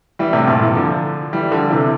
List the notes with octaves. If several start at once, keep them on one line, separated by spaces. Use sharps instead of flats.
E3 G3
A2 C3
G2 A#2
C3 E3
D3 F3
E3 G3
D3 F3
C3 E3